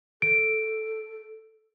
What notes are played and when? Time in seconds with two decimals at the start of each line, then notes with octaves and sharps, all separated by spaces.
0.22 A4 D7